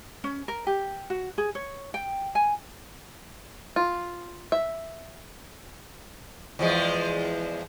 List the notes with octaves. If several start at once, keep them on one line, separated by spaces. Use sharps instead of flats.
C#4
A#4
G4
F#4
G#4
C#5
G5
G#5
F4
E5
E2 F3 G#3